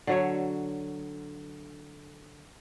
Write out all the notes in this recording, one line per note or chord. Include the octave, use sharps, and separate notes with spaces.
D3 F#3 C#5